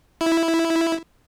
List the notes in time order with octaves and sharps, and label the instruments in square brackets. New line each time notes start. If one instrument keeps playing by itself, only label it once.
[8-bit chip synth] E4